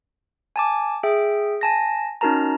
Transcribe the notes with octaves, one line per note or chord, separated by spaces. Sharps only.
G#5 A5 D6
G#4 E5 G5
G#5 A5 A#6
C#4 D#4 F#4 A#4 A5 A#5